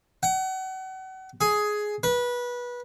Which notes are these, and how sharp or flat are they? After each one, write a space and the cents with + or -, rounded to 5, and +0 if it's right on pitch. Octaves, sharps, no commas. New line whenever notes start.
F#5 +35
G#4 +10
B4 -20